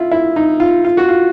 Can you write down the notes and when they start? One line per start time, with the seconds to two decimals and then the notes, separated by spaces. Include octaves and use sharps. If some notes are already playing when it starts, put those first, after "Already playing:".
Already playing: E4 F4
0.12 E4
0.36 D#4
0.60 F4
0.85 F4
0.97 F#4
1.09 F4